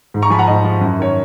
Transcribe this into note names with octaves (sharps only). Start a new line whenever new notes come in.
G#2
A#5 C#6
F3 G#5 B5
F#5 A#5
G#2 D#5
F3
F#2
D#3 C#5